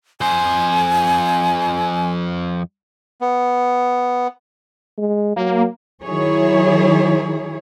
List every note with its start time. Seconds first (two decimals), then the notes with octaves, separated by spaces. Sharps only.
0.21 F2 C5 G#5
3.21 B3
4.98 G#3
5.36 F#3 A#3
6.03 D#3 F#3 E4 G#4 C#5